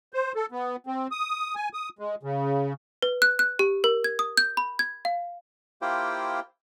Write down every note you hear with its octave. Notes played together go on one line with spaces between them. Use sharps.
C5
A4
B3
C4
D#6
G#5
D#6
G#3
C#3
B4
F#6
F#6
G4
A#4
G#6
D#6
G6
B5
G#6
F5
A#3 E4 F4 G4 C5 G5